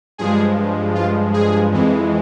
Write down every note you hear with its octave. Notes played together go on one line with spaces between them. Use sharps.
G2 F3 G#3 G#4
F4
G#4
F2 E3 G#3